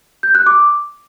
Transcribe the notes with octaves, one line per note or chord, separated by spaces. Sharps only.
G6
F#6
D6